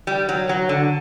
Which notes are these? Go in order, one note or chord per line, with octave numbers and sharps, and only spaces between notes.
G3
F#3
F#3
D3